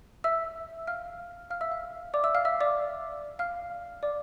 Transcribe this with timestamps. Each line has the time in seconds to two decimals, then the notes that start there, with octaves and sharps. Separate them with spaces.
0.24 E5 E6
0.87 F5 F6
1.50 F5 F6
1.61 E5 E6
1.71 F5
2.14 D5 D6
2.24 E5 E6
2.35 F5 F6
2.45 E5 E6
2.60 D5 D6
3.39 F5 F6
4.03 D5 D6